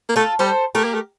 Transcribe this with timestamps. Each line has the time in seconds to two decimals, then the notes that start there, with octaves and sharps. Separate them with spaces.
0.09 A#3
0.16 A3 F4 A4
0.39 G3 A4 C5
0.75 A3 G4 A#4
0.84 A#3
0.94 A3